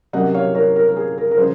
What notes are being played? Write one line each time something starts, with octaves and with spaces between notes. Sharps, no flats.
C3 F#3 A#3 C#4 D#5 F#5
C#5 F5
A#4 C#5
A#4
A#4
G#4
A#4
A#4
C#3 F3 G#4 C5